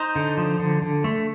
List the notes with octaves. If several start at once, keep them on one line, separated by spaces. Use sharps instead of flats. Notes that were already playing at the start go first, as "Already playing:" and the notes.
Already playing: D#4 C5
D3
F3
D3
D3
A3